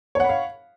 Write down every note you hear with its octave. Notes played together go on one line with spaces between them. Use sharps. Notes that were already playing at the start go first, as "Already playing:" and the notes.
C#5 F5 F#5 B5